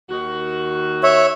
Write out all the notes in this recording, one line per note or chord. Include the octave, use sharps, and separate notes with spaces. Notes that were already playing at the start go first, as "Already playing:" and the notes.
D#2 D#3 F#4
C#5 E5